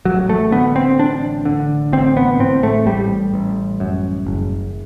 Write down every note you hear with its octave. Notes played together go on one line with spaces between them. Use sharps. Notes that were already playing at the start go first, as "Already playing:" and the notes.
A1 F#3
A3
D3 B3
C4
A1 D4
D3
A1 C4
B3
A2 C4
A3
A1 G3
A1
F#2
F#1